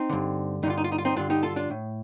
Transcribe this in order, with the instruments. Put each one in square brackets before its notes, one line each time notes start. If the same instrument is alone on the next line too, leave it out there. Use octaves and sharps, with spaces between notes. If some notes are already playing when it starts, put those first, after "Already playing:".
Already playing: [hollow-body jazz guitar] C4 D#4
G2 D3
G2 D#4
D3 F4
D#4
F4
D#4
F4
C4 D#4
G2 D3 D4 F4
D#4 G4
F4 A4
D4 F4
A2